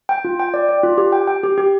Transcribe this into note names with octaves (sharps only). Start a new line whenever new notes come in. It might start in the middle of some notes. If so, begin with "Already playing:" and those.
G5
F4
G5
D5
D5
F4
G4
G5
G5
G4
G4